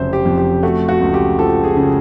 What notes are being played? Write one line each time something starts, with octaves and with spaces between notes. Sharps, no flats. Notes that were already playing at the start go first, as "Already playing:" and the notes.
Already playing: F1 C#3 F#3 C5 E5
G4
F2
G4
A3 F#4
F#4
C#2
G4
F3 A4
G#4
C#3